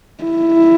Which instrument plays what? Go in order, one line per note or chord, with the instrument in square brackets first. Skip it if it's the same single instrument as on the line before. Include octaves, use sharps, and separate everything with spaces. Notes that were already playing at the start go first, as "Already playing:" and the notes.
[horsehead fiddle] E4